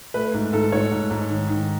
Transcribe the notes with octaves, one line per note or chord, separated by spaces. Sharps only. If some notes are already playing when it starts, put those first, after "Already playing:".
A3 B4
G#2
G#2 A4
G#2 C#5
G#2
G#2
D#3
D#3